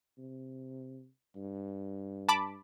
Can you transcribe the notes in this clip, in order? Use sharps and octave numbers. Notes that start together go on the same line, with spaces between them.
C3
G2
A5 B5 D6